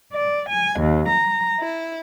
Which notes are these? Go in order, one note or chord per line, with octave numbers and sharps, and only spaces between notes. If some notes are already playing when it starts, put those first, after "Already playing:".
D5
G#5
D#2
A#5
E4